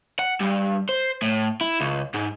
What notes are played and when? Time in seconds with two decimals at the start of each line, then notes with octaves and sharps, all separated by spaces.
0.19 F#5
0.41 G2
0.89 C5
1.22 A2
1.61 E4
1.80 C#2
2.14 G#2